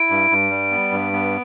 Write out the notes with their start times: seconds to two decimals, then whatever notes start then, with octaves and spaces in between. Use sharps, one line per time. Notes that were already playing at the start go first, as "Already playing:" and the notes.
Already playing: E4 D7
0.10 G2
0.31 G2
0.50 G3
0.71 B3
0.91 G2
1.13 B3